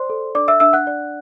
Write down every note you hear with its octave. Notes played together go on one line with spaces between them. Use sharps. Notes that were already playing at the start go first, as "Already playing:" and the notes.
Already playing: C5 D5 C6
A4
D4 D5 D6
E5 E6
D4 E5 E6
F#5 F#6
D5